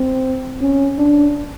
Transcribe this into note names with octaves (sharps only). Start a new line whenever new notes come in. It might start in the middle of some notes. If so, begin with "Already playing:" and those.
Already playing: C4
C#4
D4